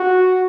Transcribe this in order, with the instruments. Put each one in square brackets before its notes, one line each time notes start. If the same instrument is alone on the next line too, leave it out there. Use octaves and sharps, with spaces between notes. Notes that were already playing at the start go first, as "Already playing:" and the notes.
Already playing: [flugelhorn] F#4